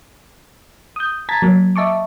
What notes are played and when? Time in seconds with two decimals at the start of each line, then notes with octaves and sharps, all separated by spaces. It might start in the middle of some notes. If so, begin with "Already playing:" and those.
0.96 D#6 G6
1.29 A5 A#5 G#6 A6 B6
1.42 F#3 A#3
1.76 D#5 E5 A5 C#6 D6